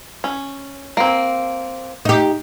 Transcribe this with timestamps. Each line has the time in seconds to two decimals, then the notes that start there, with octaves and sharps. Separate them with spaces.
0.24 C#4
0.97 A#3 C4
2.05 D#4 G4